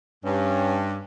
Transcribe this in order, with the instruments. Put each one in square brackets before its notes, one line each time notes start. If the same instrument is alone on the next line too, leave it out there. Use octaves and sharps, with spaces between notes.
[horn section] G2 [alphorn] C#4